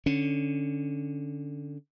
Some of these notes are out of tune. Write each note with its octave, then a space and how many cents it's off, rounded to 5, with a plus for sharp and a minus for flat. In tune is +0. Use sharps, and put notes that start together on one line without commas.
D3 +0 C#4 +0